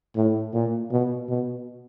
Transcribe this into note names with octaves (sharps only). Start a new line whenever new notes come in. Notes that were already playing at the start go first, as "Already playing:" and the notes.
A2
A#2
B2
B2